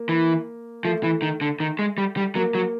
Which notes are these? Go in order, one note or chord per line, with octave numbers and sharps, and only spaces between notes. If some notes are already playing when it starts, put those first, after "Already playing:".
Already playing: A#3
E3
F3 A3
E3
D#3
D3
D#3
G#3
G3
G3
F#3 A#3
F#3